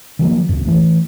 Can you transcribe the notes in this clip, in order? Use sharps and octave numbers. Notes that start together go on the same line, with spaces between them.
D#3 F3 F#3 A#3
C#2 F#2
E3 A3